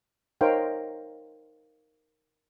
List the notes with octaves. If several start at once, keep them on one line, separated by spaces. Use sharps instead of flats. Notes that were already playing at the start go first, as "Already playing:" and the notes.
D#4 A#4 C5 C#5 F5 G5